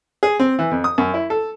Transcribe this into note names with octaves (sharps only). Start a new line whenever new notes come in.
G#4
C4
E3
F2
D#6
F#2
E4
A4